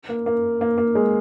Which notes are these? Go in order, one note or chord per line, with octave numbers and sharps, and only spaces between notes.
A#3
A#3
A#3
A#3
G#3